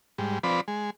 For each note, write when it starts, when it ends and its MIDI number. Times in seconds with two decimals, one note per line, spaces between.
0.18 0.39 44
0.18 0.39 55
0.43 0.61 53
0.43 0.61 60
0.43 0.61 71
0.43 0.61 74
0.43 0.61 83
0.68 0.90 56